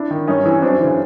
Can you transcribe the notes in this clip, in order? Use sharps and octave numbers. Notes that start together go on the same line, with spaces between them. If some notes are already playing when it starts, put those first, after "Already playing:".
Already playing: D4 E4
D#3
G2 C#4 D#4
E3
F#2 C4 D4
C#3 E3